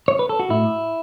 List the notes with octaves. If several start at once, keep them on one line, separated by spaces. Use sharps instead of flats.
C#5
B4
A4
F#4
A2 E4